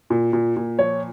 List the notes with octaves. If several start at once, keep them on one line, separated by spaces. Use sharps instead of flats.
A#2
A#2
A#2
F3 C#5